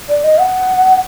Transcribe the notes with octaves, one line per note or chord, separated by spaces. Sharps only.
D5
D#5
F#5